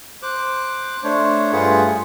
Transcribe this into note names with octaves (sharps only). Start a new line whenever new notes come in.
C5 D6 F#6
A3 D4 C5 C#5
G2 A3 F4 G#4 B4 F#5